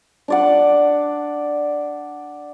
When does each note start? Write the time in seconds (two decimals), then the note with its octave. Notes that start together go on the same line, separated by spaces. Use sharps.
0.28 D4 D5 F#5